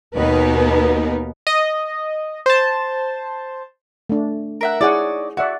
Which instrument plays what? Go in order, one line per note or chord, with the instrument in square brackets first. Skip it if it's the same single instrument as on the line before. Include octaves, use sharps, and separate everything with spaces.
[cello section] D#2 B2 B3 D#4 A#4 B4
[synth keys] D#5
C5 A5
[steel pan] A3 D4
[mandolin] A#4 E5 F#5
[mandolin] D#4 C#5 D5 [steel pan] E4 G#4 F#5
[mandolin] F#4 [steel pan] D5 E5 F#5